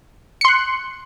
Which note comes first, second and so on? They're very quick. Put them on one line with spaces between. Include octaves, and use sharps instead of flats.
C#7 C6 F#6